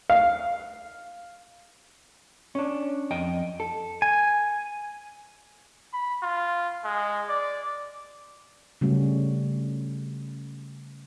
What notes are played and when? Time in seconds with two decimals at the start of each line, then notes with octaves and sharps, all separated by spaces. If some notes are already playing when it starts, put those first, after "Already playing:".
0.10 F5
2.55 C#4 D4
3.11 F2 D#5 G5
3.60 A4
4.02 G#5
5.93 B5
6.22 F4
6.84 G#3
7.29 D5
8.81 C#3 G3 A3 C#4 F#4